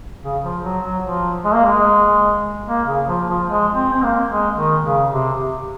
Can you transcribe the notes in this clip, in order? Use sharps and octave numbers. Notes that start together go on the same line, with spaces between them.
C#3
F3
F#3
F#3
F3
G#3
A#3
G#3
A#3
C#3
F3
F3
G#3
C4
C4
A#3
G#3
D#3
C#3
C3